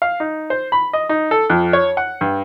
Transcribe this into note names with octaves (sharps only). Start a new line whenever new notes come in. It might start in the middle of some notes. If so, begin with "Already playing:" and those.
F5
D#4
C5
B5
D#5
D#4
A4
F2
C#5
F#5
G2